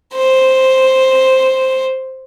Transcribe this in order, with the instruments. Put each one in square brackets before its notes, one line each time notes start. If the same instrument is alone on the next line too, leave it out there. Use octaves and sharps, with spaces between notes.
[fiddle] C5